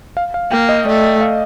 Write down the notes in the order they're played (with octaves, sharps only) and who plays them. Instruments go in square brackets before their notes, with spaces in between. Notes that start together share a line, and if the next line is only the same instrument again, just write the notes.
[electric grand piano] F5
F5
[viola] A#3 [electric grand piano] G5
[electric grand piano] D#5
[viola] A3 [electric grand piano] D5
[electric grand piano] F5